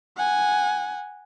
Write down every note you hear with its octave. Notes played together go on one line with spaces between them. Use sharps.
F#5 G#5